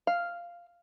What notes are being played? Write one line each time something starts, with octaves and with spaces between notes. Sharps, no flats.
F5